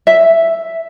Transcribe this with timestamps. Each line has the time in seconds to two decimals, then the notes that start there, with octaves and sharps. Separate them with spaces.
0.07 E5